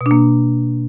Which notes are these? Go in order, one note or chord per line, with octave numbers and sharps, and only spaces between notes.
B2
D4
A#3